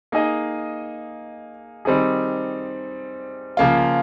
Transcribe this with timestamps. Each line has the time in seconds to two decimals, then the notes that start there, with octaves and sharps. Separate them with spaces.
0.12 A#3 D#4 G#4 D#5
1.85 D#3 G3 C4 D#4 G#4
3.57 C#3 F3 A#3 F4